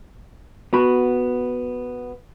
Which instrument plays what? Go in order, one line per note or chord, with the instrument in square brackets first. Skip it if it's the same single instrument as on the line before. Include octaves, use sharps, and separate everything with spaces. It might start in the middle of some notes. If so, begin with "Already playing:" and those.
[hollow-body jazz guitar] B3 F#4 B5